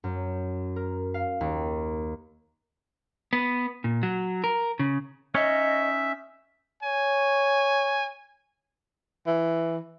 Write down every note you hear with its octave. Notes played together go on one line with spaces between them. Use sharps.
F#2
A#4
F5
D#2
B3
A#2
F#3
A#4
C#3
C#4 D#4 C#5 D#5 E5
C#5 G#5
E3